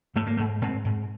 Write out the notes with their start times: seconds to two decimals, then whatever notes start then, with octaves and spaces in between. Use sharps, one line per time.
0.16 G#2 A3
0.27 A#3
0.37 G#2 A3
0.62 G#2 C4
0.85 G#2